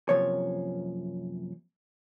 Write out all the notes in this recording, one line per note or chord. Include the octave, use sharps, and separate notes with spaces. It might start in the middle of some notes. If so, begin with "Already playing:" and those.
F#2 C3 F3 A#3 C#5